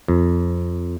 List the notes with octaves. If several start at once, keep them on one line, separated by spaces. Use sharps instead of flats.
F2